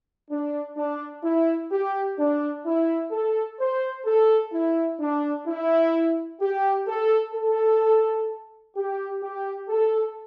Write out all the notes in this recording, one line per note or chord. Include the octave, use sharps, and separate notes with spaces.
D4
D4
E4
G4
D4
E4
A4
C5
A4
E4
D4
E4
G4
A4
A4
G4
G4
A4